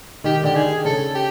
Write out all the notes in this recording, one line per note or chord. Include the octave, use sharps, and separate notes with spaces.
D#3 G4
D3 G4
D#3 G#4
C#3 A4
G4